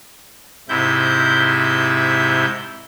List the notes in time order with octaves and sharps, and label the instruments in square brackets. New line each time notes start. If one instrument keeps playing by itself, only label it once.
[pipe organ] G#2 C3 E4 G6